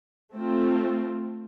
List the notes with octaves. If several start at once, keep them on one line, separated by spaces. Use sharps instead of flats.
A3 C4 F4